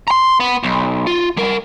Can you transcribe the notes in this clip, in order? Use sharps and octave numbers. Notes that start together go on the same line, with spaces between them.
A#5 C6
B3
B1
F4
G3 A#4